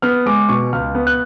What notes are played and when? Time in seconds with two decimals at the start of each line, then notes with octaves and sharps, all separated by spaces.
0.02 B3 F6
0.26 G#3 D6
0.49 B2 C#6
0.72 C#2 F6
0.95 B3
1.07 F#6